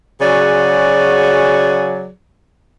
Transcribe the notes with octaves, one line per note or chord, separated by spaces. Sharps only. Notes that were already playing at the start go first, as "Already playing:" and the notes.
C#3 F#3 F#4 G#4 D5